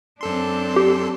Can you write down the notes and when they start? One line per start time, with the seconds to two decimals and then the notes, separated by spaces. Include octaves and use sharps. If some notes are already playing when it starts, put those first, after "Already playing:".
0.21 F#2 C4 D4 A4 C6
0.76 G4